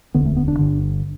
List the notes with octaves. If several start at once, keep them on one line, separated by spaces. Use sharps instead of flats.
E1 D2 D3 B3
A3
B3
D4
G1 G2 D3